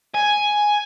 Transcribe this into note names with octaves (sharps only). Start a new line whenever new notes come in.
G#5